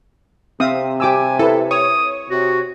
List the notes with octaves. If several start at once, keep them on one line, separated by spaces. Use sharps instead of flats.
C3 C4 E5 F5 D#6
G4 G#5 D6 E6
E4 A4 B4
C#5 D#6
C3 F#4